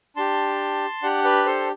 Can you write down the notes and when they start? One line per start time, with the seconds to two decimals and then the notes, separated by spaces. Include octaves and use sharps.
0.16 D4 G4 A5 C6
1.02 D4 G4 D5 F#5
1.24 B4 D5
1.46 A4 C5